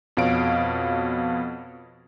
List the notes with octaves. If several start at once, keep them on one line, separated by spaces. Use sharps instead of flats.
F2 B2 C#5 F5 D7